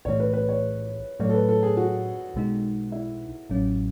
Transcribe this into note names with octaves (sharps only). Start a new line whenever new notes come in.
B1 A2 E3 A3 C#5
B4
B4
C#5
A2 F#3 A3 C#5
A4
B4
A4
G#4
F#4
B1 B2 G#3 D#4
E4
A1 A2 F#3 C#4